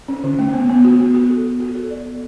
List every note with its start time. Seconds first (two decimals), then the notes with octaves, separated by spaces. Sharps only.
0.08 C#4
0.24 D3
0.39 A3
0.54 B3
0.69 B3
0.85 F#4
1.00 B3
1.14 F#4
1.30 A4
1.45 B3
1.60 F#4
1.75 A4
1.91 D5
2.05 B3